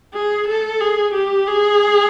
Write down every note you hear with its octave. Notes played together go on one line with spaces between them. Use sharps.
G#4
A4
G#4
G4
G#4